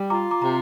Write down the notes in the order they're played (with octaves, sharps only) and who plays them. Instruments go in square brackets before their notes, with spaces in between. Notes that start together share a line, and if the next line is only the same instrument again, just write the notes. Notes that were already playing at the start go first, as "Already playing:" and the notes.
Already playing: [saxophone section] G3
[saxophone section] F4 [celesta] A#5 D6
[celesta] A#5 D6
[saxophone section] C3 [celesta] A#5